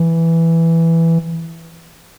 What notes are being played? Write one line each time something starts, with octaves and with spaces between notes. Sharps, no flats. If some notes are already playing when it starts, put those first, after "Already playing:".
Already playing: E3